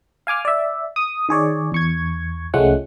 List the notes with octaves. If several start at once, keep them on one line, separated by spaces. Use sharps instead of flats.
F5 G#5 D6 F6
D5 E5
D#6
D#3 G#4 C#5 D5
E2 C#6 G#6
C2 F3 G#3 A3 C#4 F#5